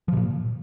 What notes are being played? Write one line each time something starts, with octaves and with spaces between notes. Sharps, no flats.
F3
C3
A#2